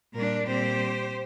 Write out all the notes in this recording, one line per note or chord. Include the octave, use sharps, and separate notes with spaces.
A#2 G3 D4 A#4
A#2 G3 C4 G4 C5